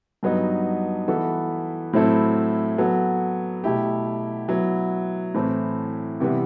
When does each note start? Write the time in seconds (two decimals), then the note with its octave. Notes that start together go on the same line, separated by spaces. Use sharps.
0.23 G2 F#3 B3 D#4
1.08 E3 B3 F#4 A4
1.93 A2 F#3 C4 E4 A4
2.78 F#3 B3 F#4 A4
3.64 B2 A3 E4 G4
4.49 F#3 B3 E4
5.34 A2 E3 A3 C4
6.20 C3 E3 G3 B3